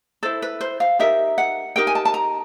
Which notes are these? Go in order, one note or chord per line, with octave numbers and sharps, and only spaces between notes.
E4 A4 C5
B4
C5
F5
D#4 G4 A#4 E5
F#5
D#4 G4 A#4 G5
G#5
A5
A5
A#5